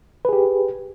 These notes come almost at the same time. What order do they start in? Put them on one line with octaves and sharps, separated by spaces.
B4 G#4 G4